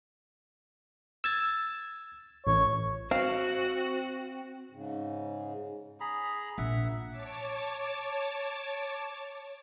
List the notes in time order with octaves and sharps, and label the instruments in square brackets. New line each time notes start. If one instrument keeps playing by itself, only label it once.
[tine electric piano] E6 G#6 A6
[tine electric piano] A1 [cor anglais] C#5
[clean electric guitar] C4 [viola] F#4 [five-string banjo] F5
[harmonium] G#2 C#3
[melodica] G#4 A#5 B5
[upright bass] A#1 [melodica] E5 F#5
[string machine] C#5 A5 D6